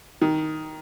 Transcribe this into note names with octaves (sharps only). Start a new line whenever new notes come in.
D#3